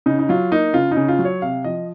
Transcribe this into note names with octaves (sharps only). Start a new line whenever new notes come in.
C#3 D#4
D#4
F#3 F4
A#3 D#4
C#3 F4
D#4
C#3
F4
F#3
C#5
C3 F5
F3 D#5